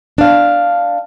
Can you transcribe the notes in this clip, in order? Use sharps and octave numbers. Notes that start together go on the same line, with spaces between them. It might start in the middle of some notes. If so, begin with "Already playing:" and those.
D4 F5